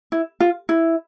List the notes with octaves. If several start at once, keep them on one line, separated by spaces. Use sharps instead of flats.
E4
F4
E4